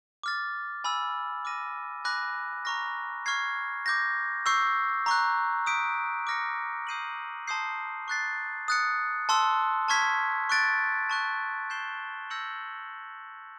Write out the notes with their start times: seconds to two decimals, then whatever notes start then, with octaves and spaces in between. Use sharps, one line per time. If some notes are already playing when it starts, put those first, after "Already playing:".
0.23 D6 F6 A6
0.84 G#5 B5 E6
1.45 D6 F6 A#6 D#7
2.05 G#5 B5 D6 F#6 A#6
2.65 A#5 C#6 F6 A#6
3.26 C#6 F6 G#6 C7
3.86 D6 G6 A#6
4.46 C#6 E6 G6 C7
5.06 A#5 C#6 F#6
5.66 D#6 G6 B6 D7
6.27 D6 F6 A#6 C#7
6.87 D#6 G6 C7 D#7 F#7
7.48 A5 C6 D#6 G6 C7
8.08 C#6 F#6 A6 C7
8.68 D#6 F#6 A6 C#7
9.29 A5 C6 E6
9.88 A5 C#6 F6 G#6 B6
10.49 C#6 F#6 A6 D7
11.09 A5 C#6 F#6
11.70 G6 C7 E7 G7
12.30 E6 G6 A#6 C#7 F#7